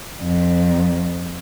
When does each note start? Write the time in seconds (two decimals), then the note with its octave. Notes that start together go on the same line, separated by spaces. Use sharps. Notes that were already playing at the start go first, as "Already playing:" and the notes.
0.22 F2